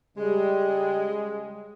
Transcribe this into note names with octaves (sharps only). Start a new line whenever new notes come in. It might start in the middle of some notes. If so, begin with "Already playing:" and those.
C#3 G3 G#3